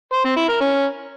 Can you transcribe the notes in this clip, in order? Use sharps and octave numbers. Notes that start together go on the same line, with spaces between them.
C5
C4
E4
A#4
C#4